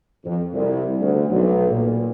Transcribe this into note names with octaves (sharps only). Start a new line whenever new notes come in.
F2
C2
D2
B1
A#2